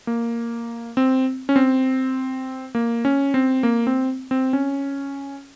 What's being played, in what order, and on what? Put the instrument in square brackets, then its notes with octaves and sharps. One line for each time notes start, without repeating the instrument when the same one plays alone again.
[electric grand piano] A#3
C4
C#4
C4
A#3
C#4
C4
A#3
C4
C4
C#4